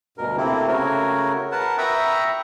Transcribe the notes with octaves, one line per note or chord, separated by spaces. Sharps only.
D2 G2 B2 A#4
C3 A3 A#3 C4 E4
C#3 A3 F#4 A#4 C#5
A#4 B4 F#5 A5
E5 G5 A#5 B5 C#6 D#6